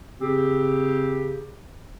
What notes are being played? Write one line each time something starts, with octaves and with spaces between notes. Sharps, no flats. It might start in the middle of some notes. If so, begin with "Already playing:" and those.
C#3 C4 G4